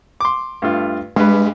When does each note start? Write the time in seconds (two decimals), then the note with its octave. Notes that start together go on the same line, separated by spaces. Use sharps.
0.21 C6 D6
0.62 G2 A3 F4
1.16 G2 G#3 G4 B4